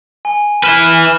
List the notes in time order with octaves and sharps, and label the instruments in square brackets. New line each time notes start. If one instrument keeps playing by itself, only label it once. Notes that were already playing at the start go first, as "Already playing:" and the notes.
[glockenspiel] G#5
[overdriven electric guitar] E4 B4 [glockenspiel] F6 E7 G7